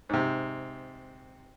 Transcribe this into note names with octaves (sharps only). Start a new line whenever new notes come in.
G#2 C3